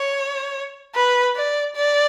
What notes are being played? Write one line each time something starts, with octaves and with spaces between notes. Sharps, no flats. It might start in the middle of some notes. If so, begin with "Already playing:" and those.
Already playing: C#5
B4
D5
D5